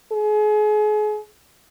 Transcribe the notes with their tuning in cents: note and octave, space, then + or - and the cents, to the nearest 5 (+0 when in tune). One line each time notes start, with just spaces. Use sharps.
G#4 +35